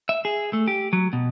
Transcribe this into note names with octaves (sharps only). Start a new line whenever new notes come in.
E5
G#4
A3
G4
F#3
B2